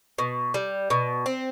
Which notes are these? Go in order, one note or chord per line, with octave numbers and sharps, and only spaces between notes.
B2
G3
B2
C4